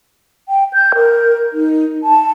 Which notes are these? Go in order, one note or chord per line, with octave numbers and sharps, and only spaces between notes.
G5
G6
A#4
D#4
A5